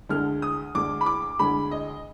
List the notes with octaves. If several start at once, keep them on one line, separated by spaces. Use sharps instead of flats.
D2 D3 G#3 F6
D#6
D2 D3 G#3 D6
B5
D6
D2 D3 G#3 B5
D#5